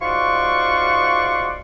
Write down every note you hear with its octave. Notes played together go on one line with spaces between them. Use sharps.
G#2 F4 F#4 D5 C6 C#6